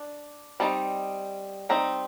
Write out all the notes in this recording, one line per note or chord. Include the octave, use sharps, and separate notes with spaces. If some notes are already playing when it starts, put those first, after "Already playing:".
Already playing: D4
G3 C4 D#4 A5
G3 C4 D#4 A#5